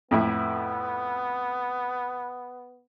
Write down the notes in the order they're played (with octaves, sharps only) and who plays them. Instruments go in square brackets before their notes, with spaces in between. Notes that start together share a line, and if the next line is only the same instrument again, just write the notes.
[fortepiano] F2 A2 E4 [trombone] B3